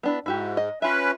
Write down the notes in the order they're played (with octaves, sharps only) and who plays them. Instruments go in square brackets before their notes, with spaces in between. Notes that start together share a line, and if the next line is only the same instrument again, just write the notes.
[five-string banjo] B3 D4 E4
[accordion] G#2 [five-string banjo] E4 F#4 G4
[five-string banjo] D#5
[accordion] C#4 B4 [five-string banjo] F4 E5